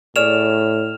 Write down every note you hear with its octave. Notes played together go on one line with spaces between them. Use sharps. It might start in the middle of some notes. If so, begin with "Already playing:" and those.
A2 G#4 C#5 D5 F6 E7 F7